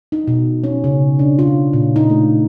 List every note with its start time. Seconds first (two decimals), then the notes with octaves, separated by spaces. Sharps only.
0.12 D#4
0.28 B2
0.64 C#4
0.84 C#3
1.19 D4
1.39 F4
1.73 A#2
1.96 D#4
2.10 A3